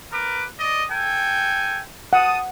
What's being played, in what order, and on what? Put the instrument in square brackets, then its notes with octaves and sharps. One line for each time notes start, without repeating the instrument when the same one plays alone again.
[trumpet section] A#4 B4 D6
D5 D#5
A4 G5 G#5
[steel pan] F#5 [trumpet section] A5 D#6